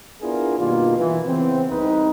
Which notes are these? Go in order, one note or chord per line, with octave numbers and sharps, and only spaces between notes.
B3 D4 E4 F4 G#4 A#4
G2 B2 D#3 A#3 F4
E3
C#3 E3 B3 C4
C2 D#4 B4